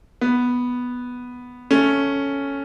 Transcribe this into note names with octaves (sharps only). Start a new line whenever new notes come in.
B3
A3 C#4